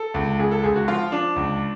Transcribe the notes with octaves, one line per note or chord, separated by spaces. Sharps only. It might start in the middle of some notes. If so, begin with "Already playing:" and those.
Already playing: A4
C#2
C#2 G#4
A4
C#2 G#4
F#4
F3 F4
F3 D4
C#2